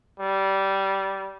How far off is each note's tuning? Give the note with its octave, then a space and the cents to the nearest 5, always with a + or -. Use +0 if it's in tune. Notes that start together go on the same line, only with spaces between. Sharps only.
G3 -15